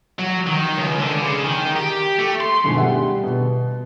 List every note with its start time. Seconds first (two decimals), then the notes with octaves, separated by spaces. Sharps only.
0.19 F#3
0.47 D#3
0.78 C#2
1.00 D3
1.22 C#3
1.44 D#3
1.76 G4
2.19 A3
2.41 C6
2.64 G1 D2 B2 D#3 G#5
2.76 G3 G#4 E5 F#5
3.23 B2